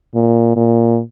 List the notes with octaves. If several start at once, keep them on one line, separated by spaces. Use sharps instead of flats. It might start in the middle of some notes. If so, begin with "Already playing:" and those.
A#2
A#2